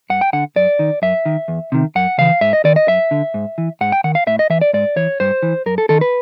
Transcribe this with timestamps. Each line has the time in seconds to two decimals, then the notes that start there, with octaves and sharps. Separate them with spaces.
0.10 G2 F#5
0.21 G5
0.33 D3 F#5
0.56 F#2 D5
0.79 D#3
1.02 F#2 E5
1.26 D#3
1.48 E2
1.72 C3 D#3
1.95 F#2 F#5
2.18 C#3 E3 F5
2.41 G#2 E5
2.53 D#5
2.64 D#3 D5
2.76 D#5
2.87 F#2 E5
3.11 D3
3.34 G#2
3.58 E3
3.81 G#2 F#5
3.92 G5
4.04 D#3 F#5
4.15 F5
4.27 A2 E5
4.39 D#5
4.50 E3 E5
4.61 D5
4.73 G#2 D5
4.96 E3 C#5
5.20 G2 C5
5.43 E3
5.66 F#2 A#4
5.78 A4
5.89 D#3 A4
6.01 B4